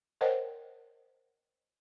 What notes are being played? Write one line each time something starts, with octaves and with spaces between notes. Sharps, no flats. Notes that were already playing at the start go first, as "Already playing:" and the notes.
A#4 C5 C#5 D#5 F#5 G5